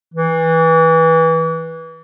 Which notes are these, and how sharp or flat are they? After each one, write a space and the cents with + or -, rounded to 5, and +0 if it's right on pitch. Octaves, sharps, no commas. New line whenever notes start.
E3 -15